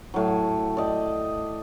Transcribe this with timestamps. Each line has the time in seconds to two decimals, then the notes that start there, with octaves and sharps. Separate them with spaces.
0.14 A2 F#3
0.77 D5 D#5 G5